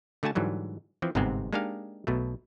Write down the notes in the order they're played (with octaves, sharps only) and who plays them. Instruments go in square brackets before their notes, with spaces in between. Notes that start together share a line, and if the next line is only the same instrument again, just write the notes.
[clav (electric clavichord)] D3 A3 F#4 G#5 A5
G#2 D3 E3 F#3 G3
E3 F3 C4
G1 G#2 C3 G#3 B3 C4
G#3 A#3 D4 D#4 G4 F5
B1 B2 A3